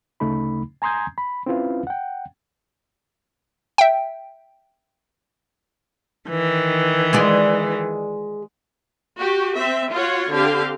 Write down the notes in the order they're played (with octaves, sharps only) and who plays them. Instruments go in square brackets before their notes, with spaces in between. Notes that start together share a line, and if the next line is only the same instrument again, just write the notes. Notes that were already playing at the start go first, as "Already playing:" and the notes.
[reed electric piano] D2 C#3 A3 D#4 B5
G#5 A#5 C6 D#6 G6 G#6
B5
C4 C#4 E4 F4 B4 F5
F#5 G5
[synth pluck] E5 G5
[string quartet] D#3 E3
[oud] G#3 F4 D5
[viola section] F#4 G4
C4 E5
F4 F#4 C#5 F#5
D3 C4 G4 F5